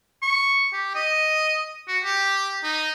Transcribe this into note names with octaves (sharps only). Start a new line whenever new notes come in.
C#6
G4
D#5
F#4
G4
D#4